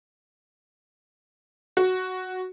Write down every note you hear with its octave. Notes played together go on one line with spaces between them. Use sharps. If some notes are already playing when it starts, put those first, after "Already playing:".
F#4